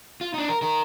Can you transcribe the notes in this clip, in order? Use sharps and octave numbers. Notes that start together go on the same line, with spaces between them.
F4
D4 D#4
A#4
D#4 A#4